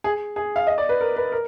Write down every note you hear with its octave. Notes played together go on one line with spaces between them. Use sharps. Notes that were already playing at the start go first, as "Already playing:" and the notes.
G#4
G#4
F5
D#5
D5
B4
A#4
B4
A#4